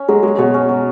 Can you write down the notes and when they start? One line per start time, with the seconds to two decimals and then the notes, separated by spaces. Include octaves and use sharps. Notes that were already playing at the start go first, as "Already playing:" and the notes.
Already playing: C#4 C#5
0.08 F#3 G#3
0.23 G#3 G#4
0.38 B2 C#5
0.54 C#4
0.69 F#3